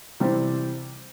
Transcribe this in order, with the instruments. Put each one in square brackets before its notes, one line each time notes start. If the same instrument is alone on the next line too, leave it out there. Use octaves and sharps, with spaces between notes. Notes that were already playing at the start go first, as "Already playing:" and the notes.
[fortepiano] C3 E3 G3 C4